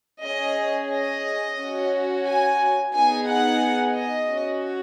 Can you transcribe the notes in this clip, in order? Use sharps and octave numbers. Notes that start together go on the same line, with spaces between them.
C#4 G#4 D#5
D#5
C#4 F#4
G#5
B3 D#4 G#4 G#5
F#5
D#5
C#4 F#4